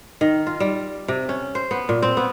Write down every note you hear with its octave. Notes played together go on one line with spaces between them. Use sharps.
D#3
F4
G3
C3
C#4
C5
B3
A#2
C4
B3